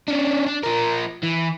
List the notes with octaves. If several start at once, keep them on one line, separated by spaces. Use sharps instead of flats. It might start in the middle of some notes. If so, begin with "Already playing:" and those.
C#4 D4
D4
F3 A#4
E3